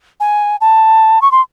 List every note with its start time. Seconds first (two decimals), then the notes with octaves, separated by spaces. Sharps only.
0.20 G#5
0.61 A5
1.22 C#6
1.32 C6